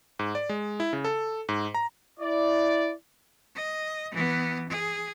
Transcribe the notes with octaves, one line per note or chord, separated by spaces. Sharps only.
G#2
D5
G#3
E4
C#3
A4
G#2
A#5
E4 D5
D#5
E3 B3
G#4